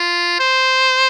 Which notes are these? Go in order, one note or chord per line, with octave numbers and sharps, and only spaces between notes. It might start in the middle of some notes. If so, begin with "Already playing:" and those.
Already playing: F4
C5